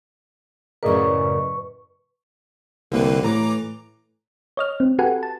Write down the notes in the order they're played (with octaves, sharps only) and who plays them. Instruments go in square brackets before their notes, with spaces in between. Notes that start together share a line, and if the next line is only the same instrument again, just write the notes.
[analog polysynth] F#2 A2 C#3 [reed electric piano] A#4 D5 D#5 [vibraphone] B4 C#6
[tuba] C2 [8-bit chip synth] D3 A#3 B4
[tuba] A2 [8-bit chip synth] E3 A#5 D6
[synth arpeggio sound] C#5 D#5 F6
C4
F#4 G4 A4 B4 F#5 G#5
A5